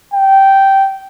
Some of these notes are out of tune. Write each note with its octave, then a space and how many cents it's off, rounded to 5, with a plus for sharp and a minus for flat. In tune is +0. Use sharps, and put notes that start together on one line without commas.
G5 -10